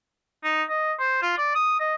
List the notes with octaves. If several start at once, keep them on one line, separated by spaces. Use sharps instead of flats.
D#4
D#5
C5
F4
D5
D#6
D#5